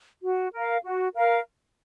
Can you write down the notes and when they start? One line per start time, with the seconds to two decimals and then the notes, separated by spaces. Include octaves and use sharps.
0.22 F#4
0.53 A#4 F5
0.84 F#4
1.14 A#4 F5